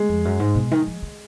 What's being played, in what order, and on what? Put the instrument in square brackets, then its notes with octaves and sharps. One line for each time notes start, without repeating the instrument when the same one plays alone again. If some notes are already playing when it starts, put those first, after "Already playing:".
Already playing: [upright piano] G#3
[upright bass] F2
F#2
G#2
B2
D#3
F3
D#3